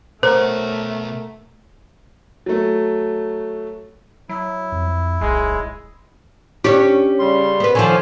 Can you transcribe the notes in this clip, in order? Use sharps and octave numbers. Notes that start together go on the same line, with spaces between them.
B2 A3 A#4 C5 C#5 F#5
F#3 A3
F#3 E4
F2
D1 B1 G#3
C#4 D4 G4 C#5
C#3 G3 C6
B3 B4
D3 D#3 F3 C#5 G#5